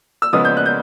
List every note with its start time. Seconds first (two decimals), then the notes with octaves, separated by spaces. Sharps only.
0.22 E6
0.33 C#3 F3 G#3 B3 D#6
0.45 G6
0.57 F#6
0.66 G6